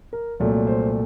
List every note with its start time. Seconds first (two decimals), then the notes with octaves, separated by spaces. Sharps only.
0.13 A#4
0.40 C2 A#2 F#3 A3
0.67 C5